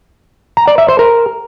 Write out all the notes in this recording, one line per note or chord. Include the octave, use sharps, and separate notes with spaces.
A#5
D5
E5
C5
A#4